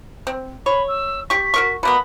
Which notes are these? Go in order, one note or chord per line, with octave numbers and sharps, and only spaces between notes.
C4
C#5 B5
E6
G4 C#6 B6
F#4 A#4 C#6
B2 A#3 B3 B5